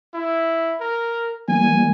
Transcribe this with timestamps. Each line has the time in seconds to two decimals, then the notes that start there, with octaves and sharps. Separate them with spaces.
0.14 E4
0.81 A#4
1.48 E3 G3 A#3 G#5